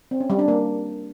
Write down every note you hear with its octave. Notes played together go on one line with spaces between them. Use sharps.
C4
C#4
G3
D4
A#3